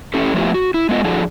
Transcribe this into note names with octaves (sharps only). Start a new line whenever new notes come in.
A2 C#4 E4 G4 A4
F3 A3 B3 E4 F4 G4
F#4
E4
G#3 A3 B3 F4 D#5
F3 D4 E4 F#4 G#4 A4